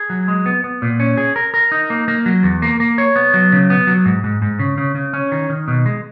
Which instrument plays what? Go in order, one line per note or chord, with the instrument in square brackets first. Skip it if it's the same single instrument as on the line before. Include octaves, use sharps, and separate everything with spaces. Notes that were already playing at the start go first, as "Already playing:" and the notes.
Already playing: [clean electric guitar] G#4
F#3
G#3
B3
B3
A#2
C#4
G#4
A#4
A#4
D#4
A#3
A#3
F#3
E2
A#3
A#3
C#5
B3
F#3
C#3
B3
F#3
G#2
G#2
G#2
C#3
C#3
C#3
C#4
D#3
D#3
B2
G#3